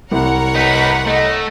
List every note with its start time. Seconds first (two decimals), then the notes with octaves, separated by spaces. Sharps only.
0.11 C2 A#4 C#5 F#5
0.55 D#4 B4 B6
1.07 A3 D#5